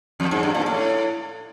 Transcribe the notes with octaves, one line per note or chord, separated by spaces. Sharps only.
F2
G#2
G2
A#2
A2